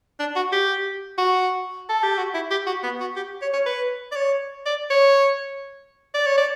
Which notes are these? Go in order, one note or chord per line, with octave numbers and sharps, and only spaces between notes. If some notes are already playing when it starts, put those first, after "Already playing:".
D4
F#4
G4
F#4
A4
G4
F#4
E4
G4
F#4
B3
F#4
G4
C#5
C#5
B4
D5
C#5
D5
C#5
D5
C#5
D5